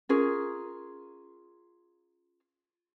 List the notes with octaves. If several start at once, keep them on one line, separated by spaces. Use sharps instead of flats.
C#4 F4 G#4 A#4